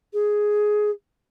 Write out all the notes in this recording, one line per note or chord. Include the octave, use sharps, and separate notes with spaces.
G#4